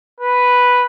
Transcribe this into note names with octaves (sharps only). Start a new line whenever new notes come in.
B4